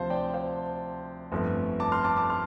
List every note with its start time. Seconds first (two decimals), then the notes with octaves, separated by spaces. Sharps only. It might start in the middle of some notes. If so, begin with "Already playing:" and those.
Already playing: D2 C3 F3 C5 F5 A5
0.10 D5 G5
0.34 C5 F5
1.32 G1 F2 F3 A3
1.80 A5 D6
1.92 C6 F6
2.04 A5 D6
2.17 A5 D6
2.30 C6 F6